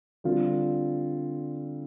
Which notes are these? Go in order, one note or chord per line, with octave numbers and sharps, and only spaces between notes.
D3 G3 C4 F4